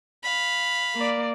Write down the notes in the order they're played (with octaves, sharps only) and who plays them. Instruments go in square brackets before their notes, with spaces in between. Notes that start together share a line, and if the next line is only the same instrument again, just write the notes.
[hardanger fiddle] F5 B5
[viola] A#3 D5